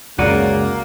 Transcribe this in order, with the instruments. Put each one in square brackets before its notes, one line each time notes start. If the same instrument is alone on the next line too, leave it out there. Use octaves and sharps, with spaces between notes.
[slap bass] C#2 F#2 [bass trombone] C#3 [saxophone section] A#3 [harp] F#4 D5 D#7